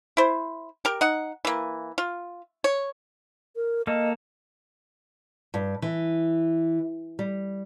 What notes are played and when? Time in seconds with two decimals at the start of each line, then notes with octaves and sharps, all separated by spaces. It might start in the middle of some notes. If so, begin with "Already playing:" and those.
0.17 E4 C5
0.85 G4 A#4
1.01 D#4 F#5
1.45 E3 A#3
1.98 F4
2.64 C#5
3.56 A#4
3.87 A#3 A4 D#5
5.54 G2
5.82 E3
7.19 G3